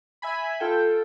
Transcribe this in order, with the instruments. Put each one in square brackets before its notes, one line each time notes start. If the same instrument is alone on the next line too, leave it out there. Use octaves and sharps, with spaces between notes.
[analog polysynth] E5 G#5 B5
F4 A4 G5